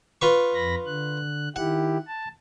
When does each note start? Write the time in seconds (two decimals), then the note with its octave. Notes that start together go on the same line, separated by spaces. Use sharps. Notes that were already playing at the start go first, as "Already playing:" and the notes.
0.22 F4 B4 C#6
0.54 F2 B5 A#6
0.86 D3 F#6
1.56 D#3 E4 G4 F#5
2.07 A5